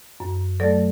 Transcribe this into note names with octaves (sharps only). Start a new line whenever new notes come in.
F#2
F#3 A3 A4 D5